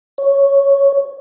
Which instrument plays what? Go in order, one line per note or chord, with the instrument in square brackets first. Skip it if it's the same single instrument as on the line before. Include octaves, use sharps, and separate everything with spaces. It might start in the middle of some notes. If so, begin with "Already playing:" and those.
[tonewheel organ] C#5